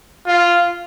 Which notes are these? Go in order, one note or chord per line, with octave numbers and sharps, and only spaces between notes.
F4